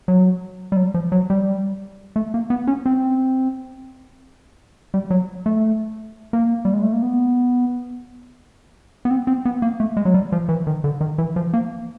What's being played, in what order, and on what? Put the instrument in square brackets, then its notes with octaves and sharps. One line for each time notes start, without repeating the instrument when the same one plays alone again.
[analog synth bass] F#3
G3
F#3
F3
F#3
G3
A3
A#3
B3
C#4
C4
G3
F#3
A3
A#3
G3
G#3
A3
A#3
B3
B3
C4
C4
B3
A#3
A3
G#3
F#3
G3
F3
E3
D#3
D3
D#3
E3
F3
A#3